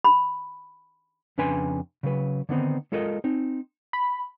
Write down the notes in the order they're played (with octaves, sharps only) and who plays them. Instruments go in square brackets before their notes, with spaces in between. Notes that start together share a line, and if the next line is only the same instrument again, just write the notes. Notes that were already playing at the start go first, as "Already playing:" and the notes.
[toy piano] B5
[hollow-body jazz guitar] F2 C#3 D4 B4 G#5 C6
C#3 F#3 B4
D3 D#3 B3 C4 D#4
G#3 F4 A4 A#4 D#5
C4 D#4
[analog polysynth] B5